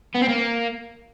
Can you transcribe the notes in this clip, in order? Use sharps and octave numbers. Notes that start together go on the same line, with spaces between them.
B3
C4
A#3